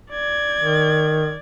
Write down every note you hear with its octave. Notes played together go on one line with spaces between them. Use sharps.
D5 G#6
D#3